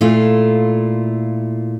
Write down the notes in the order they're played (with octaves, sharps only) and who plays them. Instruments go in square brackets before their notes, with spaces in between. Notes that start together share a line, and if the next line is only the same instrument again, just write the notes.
[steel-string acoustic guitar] A#2 A3 E4 F4